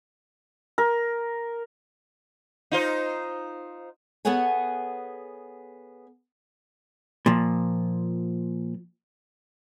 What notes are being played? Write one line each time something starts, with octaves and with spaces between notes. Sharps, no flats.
A#4
D#4 F4 C5
B3 G#4 A4 C#5 F#5 G#5
A#2 F3